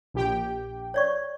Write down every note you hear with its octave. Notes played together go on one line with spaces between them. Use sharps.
A#1 G4 G5
C#5 D5 C#6